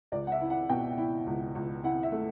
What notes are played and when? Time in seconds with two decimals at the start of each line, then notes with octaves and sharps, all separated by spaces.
0.12 C#2 D5
0.27 F#5
0.32 E5
0.41 E4
0.50 F#5
0.69 B2 G5
0.98 E4
1.27 C#2
1.55 C#2
1.84 E4 F#5
2.03 E5
2.12 A3